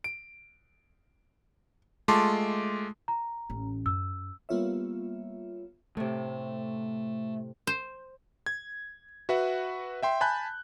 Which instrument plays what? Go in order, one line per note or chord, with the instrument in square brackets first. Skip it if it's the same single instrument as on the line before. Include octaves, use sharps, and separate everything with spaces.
[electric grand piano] D7
G#3 A3 F4 A5 C6 D6
[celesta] A#5
[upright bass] A1 C#4
[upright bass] F#2 [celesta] E6
[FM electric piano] G3 A#3 B3 F4 C#5 E5
[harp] A2 C3 [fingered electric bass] A3
[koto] C5
[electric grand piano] G#6
F#4 B4 E5 F#5
E5 G5 C6
G#5 A5 B5 F#6 G6